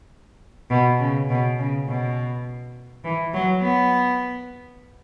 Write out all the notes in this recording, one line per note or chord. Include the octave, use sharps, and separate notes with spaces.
B2
C#3
B2
C#3
B2
E3
F#3
B3